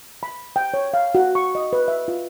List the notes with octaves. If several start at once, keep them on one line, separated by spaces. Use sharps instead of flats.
B5
G5
C#5
F5
F#4
C#6
D#5
B4
E5
F4